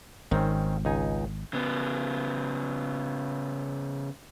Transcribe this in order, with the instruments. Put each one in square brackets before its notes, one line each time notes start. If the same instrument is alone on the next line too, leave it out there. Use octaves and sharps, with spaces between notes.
[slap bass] G#1 [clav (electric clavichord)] D#3 C4 C#4
[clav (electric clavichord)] C#2 D#4 G#5
[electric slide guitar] C#3 B3